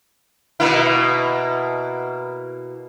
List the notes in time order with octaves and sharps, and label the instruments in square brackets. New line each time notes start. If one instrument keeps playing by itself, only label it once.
[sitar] B2 A#3 E4